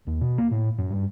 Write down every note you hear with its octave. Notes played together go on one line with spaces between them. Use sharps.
D#2
B2
A#3
A2
F#2
G2